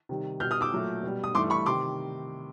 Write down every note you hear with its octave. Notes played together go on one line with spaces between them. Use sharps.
C3 D#3 G3
B2 G3 F6 G6
D#6 F6
D6 E6
A#2 F#3 A3
B2 G3
D#6
G2 E3 A3 C6 D6
B5 C#6
C3 D#3 C6 D6